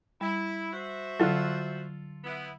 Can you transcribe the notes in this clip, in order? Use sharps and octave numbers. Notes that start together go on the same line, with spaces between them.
G3 E4
F#4 C5 E5
D3 F#3 F4 A4
B3 E4